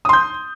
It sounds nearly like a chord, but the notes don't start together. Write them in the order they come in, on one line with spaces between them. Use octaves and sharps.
D#6 C6 G6